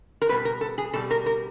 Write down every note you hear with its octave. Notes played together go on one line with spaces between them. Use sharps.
A#4
B2 G3 B4
A#4
A4
G#4
B2 G3 A4
A#4
A#4